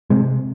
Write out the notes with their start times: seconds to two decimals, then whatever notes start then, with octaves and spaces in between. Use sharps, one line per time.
0.10 C3 G#3 C4